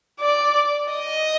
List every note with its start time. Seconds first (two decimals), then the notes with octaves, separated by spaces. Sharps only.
0.20 D5
0.93 D#5